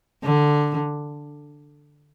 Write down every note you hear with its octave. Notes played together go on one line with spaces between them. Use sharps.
D3